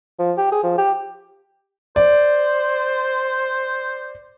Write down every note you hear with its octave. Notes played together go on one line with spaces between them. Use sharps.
F3
G4
G#4
F3
G4
C5 D5